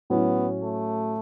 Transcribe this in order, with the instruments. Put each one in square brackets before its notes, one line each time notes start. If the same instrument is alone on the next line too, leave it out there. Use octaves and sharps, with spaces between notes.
[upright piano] A2 F#3 C#4 E4 [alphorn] B3
[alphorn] A3